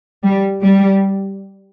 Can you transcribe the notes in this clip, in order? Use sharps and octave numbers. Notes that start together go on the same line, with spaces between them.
G3
G3